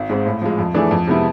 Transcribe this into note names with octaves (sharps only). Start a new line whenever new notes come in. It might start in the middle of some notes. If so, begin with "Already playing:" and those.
Already playing: G#1
G#2 G#3 C4
A2
F3 G#3
F2
E3 A3 D4 G#4
F2
C3 G#3 B3 E4